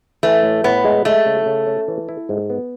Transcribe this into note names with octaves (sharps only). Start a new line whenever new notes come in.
E3 A3
A2
A2 B3
G#3
G#3 A3
C#3
C#3
C#4
E3
E4
G#2
B3